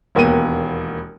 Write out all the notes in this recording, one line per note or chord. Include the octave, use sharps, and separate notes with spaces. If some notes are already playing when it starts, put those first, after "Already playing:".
E1 D#2 A#3 B3 D#7